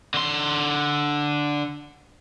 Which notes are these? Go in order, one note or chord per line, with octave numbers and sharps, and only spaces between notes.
D3 C6